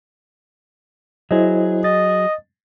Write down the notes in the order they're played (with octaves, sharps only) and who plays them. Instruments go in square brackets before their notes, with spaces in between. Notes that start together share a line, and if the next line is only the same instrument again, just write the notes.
[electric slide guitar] F#3 G#4 [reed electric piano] E4 C5 D#5
[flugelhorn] D#5 [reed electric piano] A6